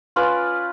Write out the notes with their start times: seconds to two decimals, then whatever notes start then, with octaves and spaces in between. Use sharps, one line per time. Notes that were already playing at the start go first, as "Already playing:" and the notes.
0.16 C#4 F4 B4 D5